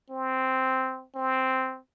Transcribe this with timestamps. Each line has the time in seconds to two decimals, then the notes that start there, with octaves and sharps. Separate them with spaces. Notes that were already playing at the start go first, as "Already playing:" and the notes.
0.10 C4
1.16 C4